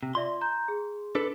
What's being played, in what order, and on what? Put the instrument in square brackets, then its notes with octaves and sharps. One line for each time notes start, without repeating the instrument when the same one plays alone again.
[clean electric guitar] C3
[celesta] F4 D5 E5 [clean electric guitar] C6
[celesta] A#5 G6
G#4
[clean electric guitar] D4 A4 B4